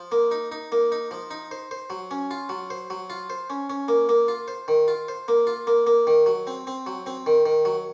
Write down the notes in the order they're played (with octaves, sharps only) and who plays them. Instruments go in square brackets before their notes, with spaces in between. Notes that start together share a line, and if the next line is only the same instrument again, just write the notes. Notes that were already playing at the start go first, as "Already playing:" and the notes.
Already playing: [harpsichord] F3
A#3
D#4
D#4
A#3
D#4
F3
D#4
C5
C5
F#3
C#4
F4
F#3
C5
F#3
F4
C5
C#4
C#4
A#3
A#3
F4
C5
D#3
F4
C5
A#3
F4
A#3
A#3
D#3
F#3
C4
C4
F#3
C4
D#3
D#3
F#3